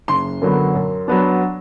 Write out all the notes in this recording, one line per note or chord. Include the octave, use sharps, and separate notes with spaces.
F#1 C6
F#2 D3 F#3 B3
F#2
F#3 B3 D4